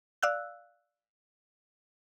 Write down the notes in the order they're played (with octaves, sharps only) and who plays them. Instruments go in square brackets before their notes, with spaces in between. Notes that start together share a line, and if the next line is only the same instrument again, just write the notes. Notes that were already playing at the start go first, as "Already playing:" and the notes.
[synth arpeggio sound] D5 F5 E6 F#6